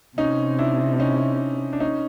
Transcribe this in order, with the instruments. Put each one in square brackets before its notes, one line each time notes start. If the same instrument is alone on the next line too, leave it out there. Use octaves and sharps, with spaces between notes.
[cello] C3 [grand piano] C#4 D#4
[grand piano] D4 E4
C#4 D#4
D4
C#4 D#4